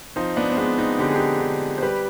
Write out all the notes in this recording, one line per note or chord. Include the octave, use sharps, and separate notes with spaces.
F3 C4 D#4
B3 D4
C4
G#3 B3 D4
C4 D#4
D3 G4
G#4
D#4 G4
D3
C5
G3 G4 B4